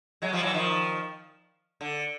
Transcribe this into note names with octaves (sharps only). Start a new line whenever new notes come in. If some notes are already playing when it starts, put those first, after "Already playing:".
F#3 G#3
F3 G3
E3 F#3
D#3 F3
D3